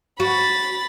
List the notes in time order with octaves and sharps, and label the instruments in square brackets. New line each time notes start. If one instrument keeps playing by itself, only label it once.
[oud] F#4 [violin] B5 A6